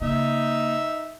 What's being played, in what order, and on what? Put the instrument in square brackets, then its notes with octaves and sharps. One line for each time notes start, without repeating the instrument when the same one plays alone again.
[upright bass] C#3 A#3 [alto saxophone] D#4 [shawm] E5